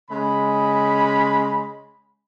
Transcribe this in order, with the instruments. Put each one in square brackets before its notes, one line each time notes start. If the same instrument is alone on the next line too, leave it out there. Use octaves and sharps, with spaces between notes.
[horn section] C#3 G#3 B5